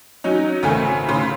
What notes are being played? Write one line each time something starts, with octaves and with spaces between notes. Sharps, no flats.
F#3 C#4 D#4
G#1 C#3 A3 G#5
A2 C#3 C6